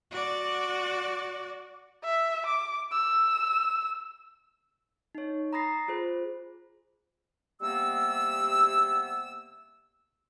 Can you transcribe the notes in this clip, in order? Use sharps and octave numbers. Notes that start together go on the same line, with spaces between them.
F#4 D5
E5
D6
E6
D#4 C#5
A#5 B5 D#6 A6 A#6 C7
F4 G#4 C5
C3 G3 A#3 B3 E6